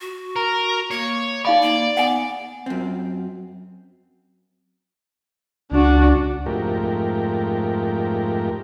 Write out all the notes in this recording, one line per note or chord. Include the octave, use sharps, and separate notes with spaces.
F#4
A#4
A#3 C#5
D#4 D5 F5 B5
A#3
B3 F#5 G#5
F#2 C4
C#2 D4 F#4
F2 G#2 A3 G4 A#4